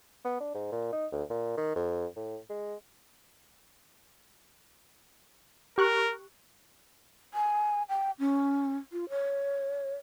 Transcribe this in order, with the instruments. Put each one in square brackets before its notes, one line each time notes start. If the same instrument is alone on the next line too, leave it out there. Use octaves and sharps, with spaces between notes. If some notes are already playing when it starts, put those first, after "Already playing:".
[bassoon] B3
D4
G#2
A#2
D#4
D2
A#2
D#3
F2
A2
G#3
[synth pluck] G4 C#6 F#6 [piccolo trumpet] A#4
[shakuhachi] G#5
G5
C#4
F4
C#5